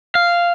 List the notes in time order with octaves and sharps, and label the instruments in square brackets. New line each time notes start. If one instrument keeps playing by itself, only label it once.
[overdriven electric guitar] F5